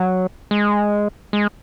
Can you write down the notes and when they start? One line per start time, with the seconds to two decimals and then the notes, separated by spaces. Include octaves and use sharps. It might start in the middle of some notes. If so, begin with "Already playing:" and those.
Already playing: F#3
0.51 G#3
1.33 G#3